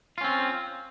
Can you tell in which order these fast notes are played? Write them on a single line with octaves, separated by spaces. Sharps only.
F4 C#4 C4